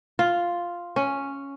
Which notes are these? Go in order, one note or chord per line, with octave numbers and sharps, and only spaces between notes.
F4
C#4